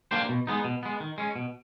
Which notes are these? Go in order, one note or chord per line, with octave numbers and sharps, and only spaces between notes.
A#3 D4 G4 C5
B2
G#3 B3 D#4
B2
G#3 B3
D#3
G#3 C#4
B2